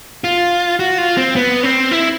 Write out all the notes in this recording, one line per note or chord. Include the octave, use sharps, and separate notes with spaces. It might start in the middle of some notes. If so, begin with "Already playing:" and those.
F4
F#4
F4
C4
B3
C4
E4